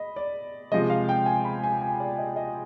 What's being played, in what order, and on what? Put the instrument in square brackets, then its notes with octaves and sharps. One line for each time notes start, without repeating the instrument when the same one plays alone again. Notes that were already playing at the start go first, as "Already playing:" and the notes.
Already playing: [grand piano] D#5 B5
D5
C3 F3 G#3 D#5
F5
G5
G#5
B5
G#5
G#5
D5
D#5
D#5